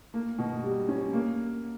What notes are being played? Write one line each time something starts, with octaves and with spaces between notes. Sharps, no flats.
A#3
B2
G3
C#4
A#3